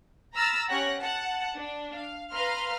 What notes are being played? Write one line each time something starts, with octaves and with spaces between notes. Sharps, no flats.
A#5 B5 E6 F6 A6 A#6
C#4 G4 C#5 F#5 F#6 A#6
F#5 A5
D4
F5
B4 F5 A#5 C6 F6